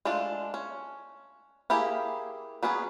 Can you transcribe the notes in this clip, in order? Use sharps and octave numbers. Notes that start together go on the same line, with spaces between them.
G#3 A3 D4 F4
C#4
A#3 E4 G4 G#4
F#3 B3 C#4 G#4